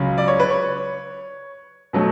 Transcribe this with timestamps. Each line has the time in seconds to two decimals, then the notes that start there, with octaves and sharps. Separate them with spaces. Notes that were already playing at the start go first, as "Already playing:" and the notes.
Already playing: C#2 C#3 F#3
0.18 D5
0.28 C#5
0.40 B4
0.50 C#5
1.93 B2 F#3 A3